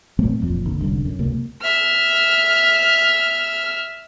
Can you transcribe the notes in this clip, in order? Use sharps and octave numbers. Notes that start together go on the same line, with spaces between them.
A#2 F#3 A3 C4
E1 F2 A#2
G#1 D3
E1 C2 F#2 D3
F#2
C#2 C3 A#3
E5 F6